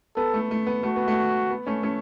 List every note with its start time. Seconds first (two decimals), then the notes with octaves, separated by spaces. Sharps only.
0.16 B3 A4
0.34 A3
0.51 A3
0.67 B3
0.83 A3 F#4
0.96 B3
1.08 A3
1.50 B3
1.66 A3 C#4
1.83 A3 C#4